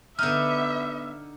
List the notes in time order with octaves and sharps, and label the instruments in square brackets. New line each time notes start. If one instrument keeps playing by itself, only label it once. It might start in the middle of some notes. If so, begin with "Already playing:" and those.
[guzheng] D3 D#4 [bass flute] B3 [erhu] E5 [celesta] F6